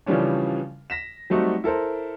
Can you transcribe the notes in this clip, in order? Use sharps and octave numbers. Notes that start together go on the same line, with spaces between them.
C#3 E3 F3 G3 C#4 D4
A#6 B6 E7
F#3 G3 A3 C4 D#4 F#4
E4 A4 A#4 C5